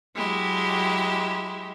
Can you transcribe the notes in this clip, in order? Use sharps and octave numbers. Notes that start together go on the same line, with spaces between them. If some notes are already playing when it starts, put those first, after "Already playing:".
F#3 G#3 E4 G4